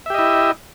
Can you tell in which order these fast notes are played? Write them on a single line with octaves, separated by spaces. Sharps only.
E5 G4 D#5 E4